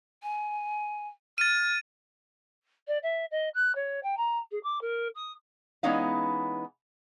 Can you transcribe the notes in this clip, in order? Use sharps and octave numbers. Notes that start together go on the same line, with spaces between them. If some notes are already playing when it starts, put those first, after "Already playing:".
G#5
F6 A6 D#7
D5
E5
D#5
F#6
C#5
G5
A#5
G#4
D6
A#4
D#6
E3 G#3 B3 C#4 D#4 F5